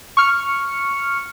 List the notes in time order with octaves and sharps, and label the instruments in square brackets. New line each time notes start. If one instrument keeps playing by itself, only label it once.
[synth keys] C#6 F6 C#7